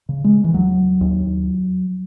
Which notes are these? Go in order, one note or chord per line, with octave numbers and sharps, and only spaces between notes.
C#3
G#3
E3
D#2 F#3
D#2